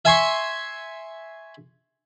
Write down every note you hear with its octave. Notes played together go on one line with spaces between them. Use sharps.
E5 G#5 C6 C#6